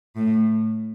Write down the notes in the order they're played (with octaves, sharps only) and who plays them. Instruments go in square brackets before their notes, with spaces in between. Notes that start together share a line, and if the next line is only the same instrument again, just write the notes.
[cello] A2